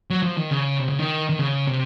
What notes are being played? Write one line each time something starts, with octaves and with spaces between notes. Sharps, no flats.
F#3
F3
D#3
C#3
C3
C#3
D#3
D#3
C#3
C3